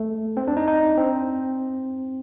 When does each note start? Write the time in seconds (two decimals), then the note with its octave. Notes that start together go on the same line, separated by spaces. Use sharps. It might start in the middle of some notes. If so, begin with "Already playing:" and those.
Already playing: A3
0.37 C4
0.48 D4
0.57 D#4
0.68 D#4
0.97 C4